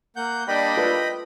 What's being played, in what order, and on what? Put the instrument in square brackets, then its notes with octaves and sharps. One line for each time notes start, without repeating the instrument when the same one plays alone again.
[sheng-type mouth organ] A#3 F#5 G6
[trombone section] G3 A#3 D4 [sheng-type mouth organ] D#5 G5 B5
[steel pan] F4 A4 B4